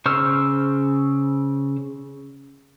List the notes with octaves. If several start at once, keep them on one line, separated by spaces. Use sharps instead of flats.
C#3 C5 C#6 E6 F6